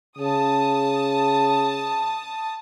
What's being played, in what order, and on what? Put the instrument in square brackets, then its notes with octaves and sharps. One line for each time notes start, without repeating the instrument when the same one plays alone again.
[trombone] C#3 [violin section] A5 D#6